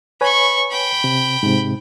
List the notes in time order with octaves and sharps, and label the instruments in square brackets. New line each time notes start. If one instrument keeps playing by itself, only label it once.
[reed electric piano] B4 C#5 G#5 [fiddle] B5 C#6
[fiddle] G5 B5
[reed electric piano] C3
G#2 C3